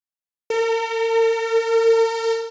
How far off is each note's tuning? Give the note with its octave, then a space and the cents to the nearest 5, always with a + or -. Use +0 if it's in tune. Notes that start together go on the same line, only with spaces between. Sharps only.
A#4 -45